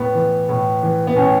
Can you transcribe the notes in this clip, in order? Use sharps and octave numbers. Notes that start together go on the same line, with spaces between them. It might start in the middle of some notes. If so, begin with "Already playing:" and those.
Already playing: A2 B3
E3
A2
E3
B3
A2 C#4